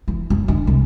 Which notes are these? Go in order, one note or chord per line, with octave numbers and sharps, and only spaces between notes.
E3
F#2
D3
C2